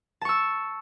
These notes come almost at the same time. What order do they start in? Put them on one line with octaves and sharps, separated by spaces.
A5 C#6 E6